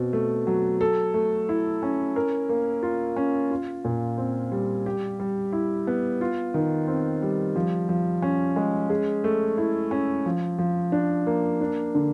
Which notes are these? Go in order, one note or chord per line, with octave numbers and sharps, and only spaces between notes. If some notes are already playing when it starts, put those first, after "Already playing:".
Already playing: B2 C4
A3
F#3
A4
A3
E4
C#4
A#4
A#3
F4
C#4
F4
A#2
C4
G3
G4
G3
E4
B3
F4
D#3
C4
G3
F3
F3
C#4
G#3
G#4
A3
E4
C#4
F3
F3
D4
A#3
D4
D3